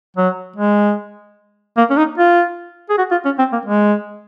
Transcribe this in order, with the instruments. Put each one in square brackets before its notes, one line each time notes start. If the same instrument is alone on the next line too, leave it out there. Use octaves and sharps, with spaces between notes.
[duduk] F#3
G#3
A#3
C#4
D#4
F4
G#4
F#4
F4
C#4
C4
A#3
G#3